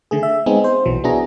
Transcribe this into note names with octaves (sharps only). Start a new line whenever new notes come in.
D3 A3 G#4
E5
G#3 B3 C4 D#4 G#4
C5
B1 E3 F#3
B3 D4 E4 F#4 G#4 A#5